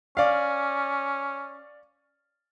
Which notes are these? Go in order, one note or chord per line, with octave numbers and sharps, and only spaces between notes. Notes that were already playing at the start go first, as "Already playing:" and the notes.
C#4 D5 F5